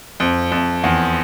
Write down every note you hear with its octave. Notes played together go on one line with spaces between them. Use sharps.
F2
F2
E2